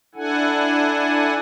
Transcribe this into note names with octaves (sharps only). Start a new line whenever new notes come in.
D4 E4 A4 F#5 G#5